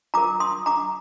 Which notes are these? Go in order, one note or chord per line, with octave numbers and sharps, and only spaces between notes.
F4 A#4 A#5 D6
C6 D#6
A#5 D6